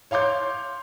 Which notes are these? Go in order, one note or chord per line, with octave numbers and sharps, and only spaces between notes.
C#5 F5 C6 D6 G6